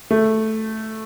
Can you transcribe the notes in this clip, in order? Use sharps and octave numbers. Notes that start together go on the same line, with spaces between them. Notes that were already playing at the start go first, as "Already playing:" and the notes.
A3